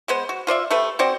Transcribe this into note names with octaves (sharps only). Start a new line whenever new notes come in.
G#3 B3 C5
F#4
F4 C5 D5 E5
A3 G4 A4 B4
C4 F#4 C5 D5